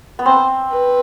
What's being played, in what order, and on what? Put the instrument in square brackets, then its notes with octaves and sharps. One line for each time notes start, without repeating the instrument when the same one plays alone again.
[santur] B3
[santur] C4 [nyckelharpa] C5
[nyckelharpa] B4